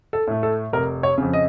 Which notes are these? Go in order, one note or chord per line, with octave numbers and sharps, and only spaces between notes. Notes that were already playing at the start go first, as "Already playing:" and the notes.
A4
A2 A3
A4
F1 A#4
C#5
F2 C#3
D#5